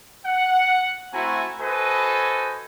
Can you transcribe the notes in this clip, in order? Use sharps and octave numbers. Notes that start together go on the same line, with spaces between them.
F#5
A3 C4 E4 F#4 G#5 A#5
F#4 A4 B4 C5 D#5 G#5